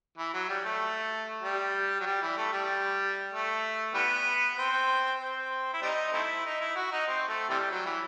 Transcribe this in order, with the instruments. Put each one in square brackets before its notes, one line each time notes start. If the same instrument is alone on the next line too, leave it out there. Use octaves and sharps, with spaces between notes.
[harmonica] E3
F#3
G3
A3
G3
F#3
G3
E3
A3
G3
A3
E3 G3 B3
C4
C4
E4
G3 C4 D#4
A3 C4 E4
D#4
E4
F#4
D#4
C4
A3
C3 E3 G3
F#3
E3